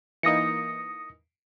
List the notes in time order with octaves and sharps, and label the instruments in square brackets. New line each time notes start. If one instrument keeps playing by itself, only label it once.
[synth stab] E3 A#3 D#4 [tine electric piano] D#6 A#6 C#7